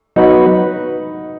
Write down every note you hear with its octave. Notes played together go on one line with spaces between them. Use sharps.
F#3 B3 D#4 F#4 B4